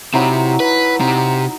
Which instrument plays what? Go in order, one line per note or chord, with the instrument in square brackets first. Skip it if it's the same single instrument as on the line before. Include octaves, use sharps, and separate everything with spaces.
[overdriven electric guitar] C3 [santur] F#3 D#4 E4
[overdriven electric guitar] B4
[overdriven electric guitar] C3 [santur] D#4